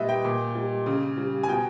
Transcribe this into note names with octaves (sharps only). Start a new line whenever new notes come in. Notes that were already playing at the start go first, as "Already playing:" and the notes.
Already playing: A#2 G3 B4 D#5 E5
G5
A#2
G3
C#3
G3
G#5
B2 G5